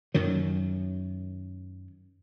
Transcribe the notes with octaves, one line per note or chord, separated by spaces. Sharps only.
F#2 D#3 F#3